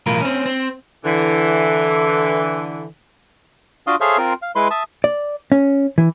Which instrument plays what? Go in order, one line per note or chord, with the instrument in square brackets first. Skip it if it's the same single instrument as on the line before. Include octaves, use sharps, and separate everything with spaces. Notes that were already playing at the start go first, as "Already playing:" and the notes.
[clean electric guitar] B1 A2 E3 F4 A#4
C4 C#4
C4
[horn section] D3 E3
[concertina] D4 F4 F#4 F5 C6 D#6
G#4 A4 C5 C#5 E5 F5
C4 F4 A#4
F5
G#3 E4 B4 B5 C6
E5 A5 D#6
[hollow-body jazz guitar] D5
C#4
E3